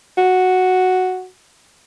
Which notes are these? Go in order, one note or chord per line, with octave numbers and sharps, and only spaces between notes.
F#4